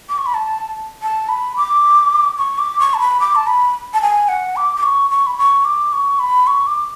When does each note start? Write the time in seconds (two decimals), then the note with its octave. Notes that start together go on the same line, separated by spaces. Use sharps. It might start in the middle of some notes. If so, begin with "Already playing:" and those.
0.09 D6
0.18 C#6
0.26 B5
0.34 A5
1.02 A5
1.29 B5
1.57 D6
2.38 C#6
2.58 D6
2.80 C#6
2.94 A5
3.00 B5
3.20 D6
3.35 A5
3.47 B5
3.94 A5
4.02 G#5
4.29 F#5
4.56 D6
4.77 D6
4.83 C#6
5.11 C#6
5.27 B5
5.38 C#6
5.65 D6
5.93 C#6
6.19 B5
6.47 C#6
6.67 D6